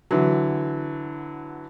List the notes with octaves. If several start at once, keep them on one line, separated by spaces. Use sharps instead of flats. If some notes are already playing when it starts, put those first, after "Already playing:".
D3 E3 F#3